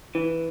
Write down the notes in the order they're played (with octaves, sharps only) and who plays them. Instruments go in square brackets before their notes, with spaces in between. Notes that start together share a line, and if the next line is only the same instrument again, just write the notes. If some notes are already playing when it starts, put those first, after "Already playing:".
[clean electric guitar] E3